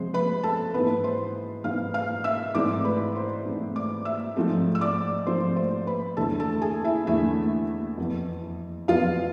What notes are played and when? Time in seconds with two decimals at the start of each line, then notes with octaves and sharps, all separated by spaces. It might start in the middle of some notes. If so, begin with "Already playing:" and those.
Already playing: C3 F3 G#3 C5 C6
0.14 B4 B5
0.43 A4 A5
0.74 G#2 E3 B3 B4 B5
1.04 C5 C6
1.64 G#2 E3 B3 F5 F6
1.94 F5 F6
2.24 E5 E6
2.55 G#2 E3 A3 C4 D5 D6
2.85 B4 B5
3.15 C5 C6
3.45 G#2 E3 A3 C4
3.76 D5 D6
4.05 E5 E6
4.36 G#2 F3 A3 C4
4.75 E6
4.81 D5 D6
5.26 G#2 F3 A3 C4 C5 C6
5.56 C5 C6
5.86 B4 B5
6.17 E2 D3 A3 A4 A5
6.40 A4 A5
6.62 G#4 G#5
6.85 E4 E5
7.07 E2 D3 A3 E4 E5
7.98 F2 E3 B3
8.88 F2 E3 B3 F4 F5